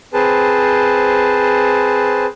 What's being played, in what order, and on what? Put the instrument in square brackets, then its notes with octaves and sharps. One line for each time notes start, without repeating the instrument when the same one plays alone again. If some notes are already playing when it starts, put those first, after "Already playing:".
[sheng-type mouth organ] C4 G#4 B4 C5 A5